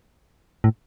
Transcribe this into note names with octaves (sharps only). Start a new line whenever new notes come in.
A2